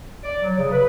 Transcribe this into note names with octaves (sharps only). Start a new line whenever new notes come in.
D5
F#3
C#3
B4